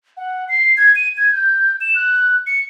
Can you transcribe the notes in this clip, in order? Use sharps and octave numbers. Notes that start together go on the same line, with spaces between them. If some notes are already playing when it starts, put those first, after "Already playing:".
F#5
C7
G#6
D#7
G#6
G6
E7
F#6
C#7